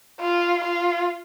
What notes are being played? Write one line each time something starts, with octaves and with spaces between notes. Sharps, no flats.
F4
F4